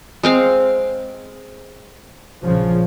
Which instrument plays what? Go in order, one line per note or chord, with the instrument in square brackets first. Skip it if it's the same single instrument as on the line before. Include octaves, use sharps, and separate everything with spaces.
[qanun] G#3 C4 F5
[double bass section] A#1 C#3 F3